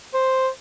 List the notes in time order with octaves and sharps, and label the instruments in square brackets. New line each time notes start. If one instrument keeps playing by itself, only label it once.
[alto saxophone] C5